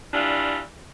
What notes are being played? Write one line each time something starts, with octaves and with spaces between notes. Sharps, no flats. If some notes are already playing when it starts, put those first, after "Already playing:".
E3 G3 D4 F4